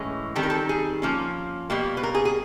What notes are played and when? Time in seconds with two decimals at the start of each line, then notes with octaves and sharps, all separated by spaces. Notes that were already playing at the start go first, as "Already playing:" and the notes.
Already playing: A2 E3 G#3 C#4
0.35 D#3 G3 C4 A4
0.43 A#4
0.50 A4
0.69 G#4
1.02 F3 A#3 C#4
1.70 B2 G3 A#3
1.97 B4
2.03 A#4
2.15 G#4
2.25 G#4